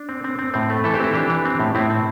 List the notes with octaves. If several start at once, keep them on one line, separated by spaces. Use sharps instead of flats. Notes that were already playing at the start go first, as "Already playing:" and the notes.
Already playing: D4
C4
C4
C4
A2 C4
A3
E3 E4 A4
G4 C5
C4 E4 A4
E3 D4 G4
E3
C4
A2
A2 C4 E4
C4